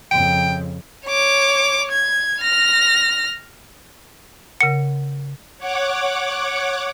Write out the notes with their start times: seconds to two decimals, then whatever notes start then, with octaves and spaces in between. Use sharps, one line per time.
0.11 F2 C#3 G5
1.06 C#5 D6
1.92 G#6
2.42 F6 A#6
4.61 C#3 A#4 F#5 C#7
5.58 C#5 F#5 D6